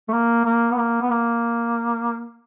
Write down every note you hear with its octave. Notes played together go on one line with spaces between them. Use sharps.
A3
A#3
A#3
B3
A#3
B3
A#3